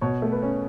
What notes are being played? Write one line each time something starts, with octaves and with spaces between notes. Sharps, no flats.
B2 C#5
A3
B4
C#4